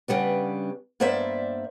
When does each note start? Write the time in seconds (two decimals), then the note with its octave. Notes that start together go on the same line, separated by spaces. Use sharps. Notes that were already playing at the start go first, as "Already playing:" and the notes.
0.08 C#3 G3 B3 D4
1.00 G2 A#3 B3 C5 D5 E5